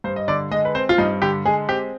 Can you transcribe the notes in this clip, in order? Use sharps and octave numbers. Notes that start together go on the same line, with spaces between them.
G2 C5
D#5
D3 D5
G#3 D#5
B4
C4 C5
F4
G2 D#4
D3 G4
G#3 G#4
C4 G4